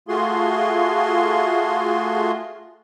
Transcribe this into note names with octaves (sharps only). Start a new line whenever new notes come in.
A3 F4 F#4 G#4 C6